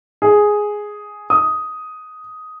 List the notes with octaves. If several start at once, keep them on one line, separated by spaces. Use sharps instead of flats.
G#4
D#6